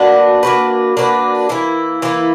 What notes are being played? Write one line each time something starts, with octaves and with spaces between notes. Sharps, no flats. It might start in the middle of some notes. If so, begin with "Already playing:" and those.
Already playing: A#3 D4 F#4 B4
A#3 D4 F#4 B4
A#3 D4 F#4 B4
E3 A#3 E4
E3 A#3 E4